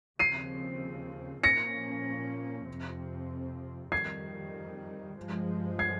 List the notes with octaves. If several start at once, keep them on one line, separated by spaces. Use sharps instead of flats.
D#2 C#3 F3 C4 C7 D#7
A#2 F3 A#3 C#4 A#6 C#7
F2 C3 F3 C4
F2 D#3 G3 G#6 C7
G2 F3 G#3
G#6 C7